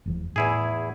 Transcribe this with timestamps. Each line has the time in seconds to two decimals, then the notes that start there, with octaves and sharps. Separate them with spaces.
0.06 F1 E2 F3
0.36 E2 A2 E4 G#4